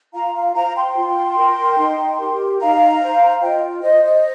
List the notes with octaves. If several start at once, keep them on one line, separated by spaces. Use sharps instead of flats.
F4 F5 A#5
F5
C5 F5 A#5
G5 C6
F4
A#4
D#4
G4 A#4
D#4 F5 A#5
C5
F4 D#5 G5
C5 D#5
D#5